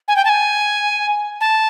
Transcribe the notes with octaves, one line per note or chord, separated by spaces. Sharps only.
G#5
G5
A5
G#5
A5